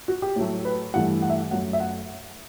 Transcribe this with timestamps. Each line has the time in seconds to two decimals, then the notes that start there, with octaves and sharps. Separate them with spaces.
0.08 F#4
0.22 G4
0.36 A2 F#3 A3
0.65 B4
0.94 G2 E3 A3 F#5
1.22 F#5
1.30 E5
1.37 F#5
1.51 F#2 F#3 A3 F#5
1.73 E5
1.80 F#5